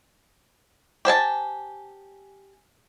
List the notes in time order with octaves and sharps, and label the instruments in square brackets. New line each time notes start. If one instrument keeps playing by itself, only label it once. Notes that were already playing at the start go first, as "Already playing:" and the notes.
[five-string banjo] G4 C5 G#5 A5